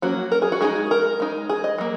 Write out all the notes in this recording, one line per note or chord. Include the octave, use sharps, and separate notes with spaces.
F#3 A#3 C#4 F#4
A#4
G#4
F#4
G#3 D#4 G#4
A#4
G#3 D#4
G#4
D#5
F#3 A#3